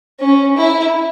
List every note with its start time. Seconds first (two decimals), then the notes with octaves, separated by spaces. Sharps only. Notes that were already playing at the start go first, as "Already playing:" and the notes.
0.20 C#4
0.57 E4